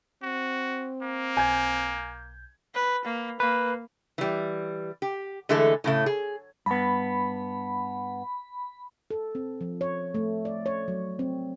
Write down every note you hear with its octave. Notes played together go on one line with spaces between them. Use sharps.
C4 F#4
A#3
B1 G#5 G6 G#6
B4
A#3
A#3 B4
E3 G3
G4
D3 E3 G#3 A3 A4
A2 C#3 A3
G#4
G2 B3 B5
A4
C4
F3
C#5
A3
D5
C#5
F#3
C4